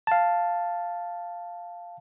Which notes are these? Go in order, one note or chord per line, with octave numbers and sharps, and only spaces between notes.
F5 A5